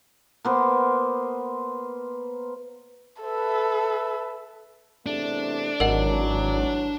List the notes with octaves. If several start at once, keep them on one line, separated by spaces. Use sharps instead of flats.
A#3 B3 C5
A4 B4 E5
E2 C3 A3 D4
G#1 G2 E3 F#3 A#4 D#5 F#5